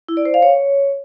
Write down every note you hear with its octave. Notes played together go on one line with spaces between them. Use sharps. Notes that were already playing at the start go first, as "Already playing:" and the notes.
E4
D5
C5
F5
C#5